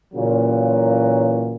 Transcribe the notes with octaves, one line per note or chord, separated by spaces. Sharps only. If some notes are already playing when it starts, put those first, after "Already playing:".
A#2 C#3 E3 F#3